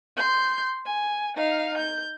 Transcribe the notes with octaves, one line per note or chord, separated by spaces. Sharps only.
C6 G6
G#5
D#4 F5
G6